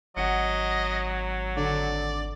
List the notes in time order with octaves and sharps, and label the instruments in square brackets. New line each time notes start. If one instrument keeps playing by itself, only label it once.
[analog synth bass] G#1 [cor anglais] F#3 [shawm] D#5 [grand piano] F#5 C#7
[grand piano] D3 [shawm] D5